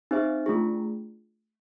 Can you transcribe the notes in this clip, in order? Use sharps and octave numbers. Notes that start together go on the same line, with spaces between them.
C4 D#4 G#4 C5 E5
A3 D4 F4 G#4